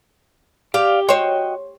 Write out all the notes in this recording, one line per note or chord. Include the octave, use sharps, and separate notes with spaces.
G4 D5 F5
F#4 C5 C#5 D#5 G5